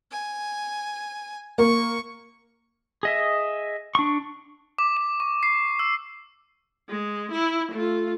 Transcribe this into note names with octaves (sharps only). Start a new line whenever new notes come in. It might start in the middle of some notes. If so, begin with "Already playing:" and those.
G#5
A#3 C#6
G#4 D#5 E5
D4 C#6
D6
D6
C#6
C7
E6
G#3
E4
A3 F4